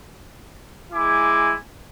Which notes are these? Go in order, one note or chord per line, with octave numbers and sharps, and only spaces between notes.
G#3 E4 G#5 D6